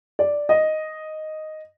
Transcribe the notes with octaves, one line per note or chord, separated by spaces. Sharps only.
D5
D#5